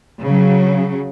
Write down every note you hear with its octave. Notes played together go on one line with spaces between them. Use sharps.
C#3 F#3